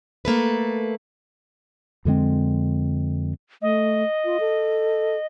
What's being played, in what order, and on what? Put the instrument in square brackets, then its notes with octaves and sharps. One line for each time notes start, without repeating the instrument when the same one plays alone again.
[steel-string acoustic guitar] A3 A#3 A4 B4
[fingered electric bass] F2 D3 G#3 C4
[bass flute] A3 [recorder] D#5
[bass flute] F4
A4